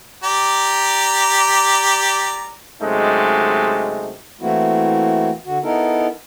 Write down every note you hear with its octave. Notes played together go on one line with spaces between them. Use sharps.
G4 D5 A#5
F#2 C3 G#3 A3 D#4
E3 A3 A#3 C4 E4 F#4
D3 F#4
B3 D#4 E4 A4 A#4